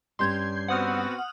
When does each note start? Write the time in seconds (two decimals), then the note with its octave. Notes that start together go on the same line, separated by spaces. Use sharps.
0.19 G2 G3 C#4 C6 G6 G#6
0.68 B3 C4 F#4 F#5 D#6 F6